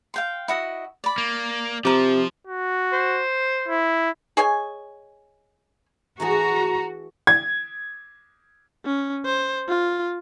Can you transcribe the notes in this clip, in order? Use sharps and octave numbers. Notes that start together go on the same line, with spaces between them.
F5 G5 C6
E4 F#4 D#5
D5 B5
A#3
C3 F3 A#4 D6
F#4
C5
E4
G#4 C#5 D#5 G#5
E3 A3 F#4 G#4 A#5
G#6
C#4
C5
F4